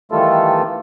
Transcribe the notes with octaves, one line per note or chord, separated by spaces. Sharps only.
D#3 E3 G3 A3 F4 A4